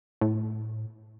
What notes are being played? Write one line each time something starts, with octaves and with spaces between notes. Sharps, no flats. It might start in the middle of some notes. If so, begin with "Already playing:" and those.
A2